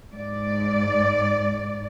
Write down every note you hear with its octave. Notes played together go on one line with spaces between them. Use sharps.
G#2 D5